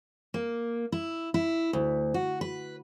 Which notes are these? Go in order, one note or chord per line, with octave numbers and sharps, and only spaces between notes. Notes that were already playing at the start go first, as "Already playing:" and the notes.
A#3
E4
E4
D2
F#4
B4